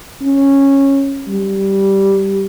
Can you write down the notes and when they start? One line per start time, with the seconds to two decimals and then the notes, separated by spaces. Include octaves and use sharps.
0.22 C#4
1.28 G3